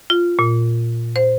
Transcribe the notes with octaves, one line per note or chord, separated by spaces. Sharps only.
F4
A#2
C5